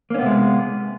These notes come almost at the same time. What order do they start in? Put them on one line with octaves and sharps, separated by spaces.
A#3 C#4 B3 C3 G#3